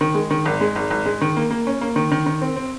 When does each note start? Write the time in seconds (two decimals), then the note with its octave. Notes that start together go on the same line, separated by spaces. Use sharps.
0.01 D#3
0.15 G#3
0.31 D#3
0.45 G#1
0.61 G#3
0.76 G#1
0.90 G#1
1.06 G#3
1.21 D#3
1.37 A#3
1.51 A#3
1.67 C#4
1.81 A#3
1.96 D#3
2.12 D#3
2.26 D#3
2.41 C4
2.56 C4